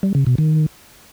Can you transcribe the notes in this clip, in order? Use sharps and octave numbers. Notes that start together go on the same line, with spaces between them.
G3
C#3
B2
D#3